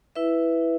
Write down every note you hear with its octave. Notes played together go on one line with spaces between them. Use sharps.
E4 B4 E5